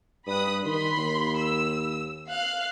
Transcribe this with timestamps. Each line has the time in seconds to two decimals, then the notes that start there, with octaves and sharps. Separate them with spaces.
0.27 G2 B5 D#6 F#6
0.65 D#3 B5 C6
0.97 D#2
1.38 E6
2.31 F5 F#6 C7